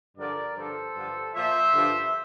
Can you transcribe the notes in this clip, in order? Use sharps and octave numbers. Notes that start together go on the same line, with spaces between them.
G2 D3 F3 A#4 D5
G2 D3 F3 A4 C5
G2 D3 F3
A#2 F3 C5 E5
G2 D3 F3